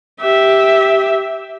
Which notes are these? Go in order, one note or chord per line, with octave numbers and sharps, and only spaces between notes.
G4 E5